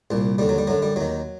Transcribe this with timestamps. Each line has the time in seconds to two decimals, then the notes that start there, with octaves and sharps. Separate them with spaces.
0.11 C2 A#2
0.38 D#2 D3 G3
0.49 F#3
0.58 G3
0.67 F#2 D3 F#3
0.82 G3
0.96 D#2 D#3 F#3